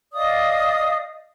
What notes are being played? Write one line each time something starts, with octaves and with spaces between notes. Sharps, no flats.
D5 D#5 F5 D#6